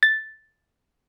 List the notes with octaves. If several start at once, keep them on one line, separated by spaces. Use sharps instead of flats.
A6